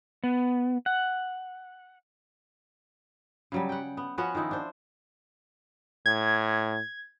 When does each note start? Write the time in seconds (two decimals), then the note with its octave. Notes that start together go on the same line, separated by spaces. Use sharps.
0.24 B3
0.86 F#5
3.52 C#3 F#3 G3
3.69 F#5 G5
3.97 B3
4.18 F3 B3 C#4 F#4
4.35 D#3 F3 D#4 E4
4.51 D4 C5
6.06 A2 G#6